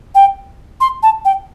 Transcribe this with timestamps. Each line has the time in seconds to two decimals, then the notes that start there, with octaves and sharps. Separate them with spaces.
0.15 G5
0.81 C6
1.03 A5
1.25 G5